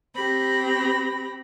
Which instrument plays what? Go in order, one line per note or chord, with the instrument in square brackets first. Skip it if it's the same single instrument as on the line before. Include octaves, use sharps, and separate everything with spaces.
[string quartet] C4 G4 B5 A#6